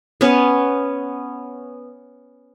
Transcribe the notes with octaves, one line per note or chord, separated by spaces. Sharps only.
B3 C#4